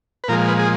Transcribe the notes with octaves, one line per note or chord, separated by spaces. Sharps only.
B4
A#2 F3 G#3 A#4
B4
G#4